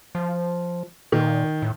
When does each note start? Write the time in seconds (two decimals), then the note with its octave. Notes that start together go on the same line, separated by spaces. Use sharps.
0.15 F3
1.12 A#2 D#3
1.62 A2